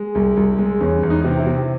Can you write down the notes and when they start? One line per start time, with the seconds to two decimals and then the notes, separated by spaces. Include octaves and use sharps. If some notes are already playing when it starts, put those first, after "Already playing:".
Already playing: G#3
0.15 C2
0.37 C2
0.59 G#3
0.80 E2 C#4
1.03 E2
1.10 D#4
1.24 C3
1.39 E4
1.47 C3